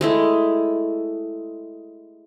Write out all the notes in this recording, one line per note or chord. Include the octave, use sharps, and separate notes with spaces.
G#3 A3 E4